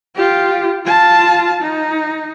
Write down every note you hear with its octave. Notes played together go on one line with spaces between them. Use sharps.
F4 G4
F4 A5
D#4